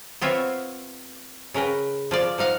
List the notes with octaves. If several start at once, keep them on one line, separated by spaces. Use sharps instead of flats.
B3 C4 F4 C#5 E5
C#3 A#4 B4 G5
F3 F4 D5
F3 D#4 F5 F#5